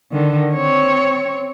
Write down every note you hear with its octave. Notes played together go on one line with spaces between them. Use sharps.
D3 D#3
C4 C#5